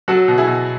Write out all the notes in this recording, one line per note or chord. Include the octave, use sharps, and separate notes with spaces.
F#3 F#4 A4
B2
E4 G#4
B2